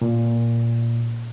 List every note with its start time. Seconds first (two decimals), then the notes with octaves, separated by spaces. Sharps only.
0.02 A#2